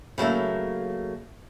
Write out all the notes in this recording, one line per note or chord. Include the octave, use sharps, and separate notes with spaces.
C#3 F#3 A3 A#3